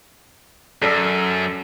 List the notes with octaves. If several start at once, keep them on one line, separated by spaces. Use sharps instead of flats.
F#2 A4 D5 E6